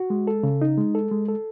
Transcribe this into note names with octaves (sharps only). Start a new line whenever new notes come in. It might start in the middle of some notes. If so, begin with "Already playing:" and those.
Already playing: F#4
G#3
A4
C#3
D#4
G#3
A4
G#3
A4